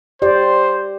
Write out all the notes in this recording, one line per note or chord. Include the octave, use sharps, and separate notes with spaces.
G4 C5 D5